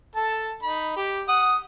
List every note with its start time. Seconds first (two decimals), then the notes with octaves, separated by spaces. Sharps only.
0.16 A4 A5
0.63 D#4 B5
0.97 G4
1.29 F#5 D#6